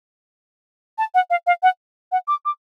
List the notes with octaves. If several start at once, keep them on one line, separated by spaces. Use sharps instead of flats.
A5
F#5
F5
F5
F#5
F#5
D6
D6